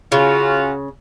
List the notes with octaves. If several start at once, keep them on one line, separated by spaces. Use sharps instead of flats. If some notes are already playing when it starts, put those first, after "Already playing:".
C#3 C#4 F4 F#4